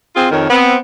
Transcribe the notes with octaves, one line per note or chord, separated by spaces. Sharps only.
C4 F4 G#4
F2 D#3 A#4 C#5
B3 C4